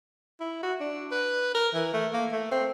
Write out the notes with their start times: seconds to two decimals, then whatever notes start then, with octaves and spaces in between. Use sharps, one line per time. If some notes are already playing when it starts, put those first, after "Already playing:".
0.40 E4
0.63 F#4
0.80 D4
1.11 B4
1.54 A#4
1.74 E3
1.93 A3
2.13 A#3
2.32 A3
2.51 C4